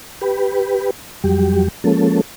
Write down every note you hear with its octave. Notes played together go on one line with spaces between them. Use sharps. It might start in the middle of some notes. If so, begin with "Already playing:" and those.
G4 B4
F2 F#3 G3 G4
F3 G#3 A#3 C#4 A4